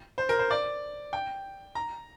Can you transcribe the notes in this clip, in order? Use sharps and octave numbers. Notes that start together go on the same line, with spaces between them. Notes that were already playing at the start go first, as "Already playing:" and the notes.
C5
A#4
C5
D5
G5
A#5